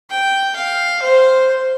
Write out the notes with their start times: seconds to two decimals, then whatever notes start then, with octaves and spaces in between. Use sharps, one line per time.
0.10 G5
0.56 F5
1.02 C5